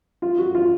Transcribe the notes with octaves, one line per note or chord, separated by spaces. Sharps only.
F4
F#4
F4